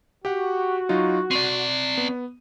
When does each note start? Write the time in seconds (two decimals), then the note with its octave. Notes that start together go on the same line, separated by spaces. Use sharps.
0.25 F#4 G4 F#5
0.89 F#3 D#4 F4
1.31 C4 D5 D#7
1.98 B3